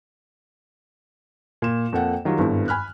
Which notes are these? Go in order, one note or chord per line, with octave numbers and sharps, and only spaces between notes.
A#2 E7
F2 A#3 A4 F#5 G5
D#3 F#3 G3 F4
G#1 G2 A3 B3 E4
G#5 B5 F6 F#6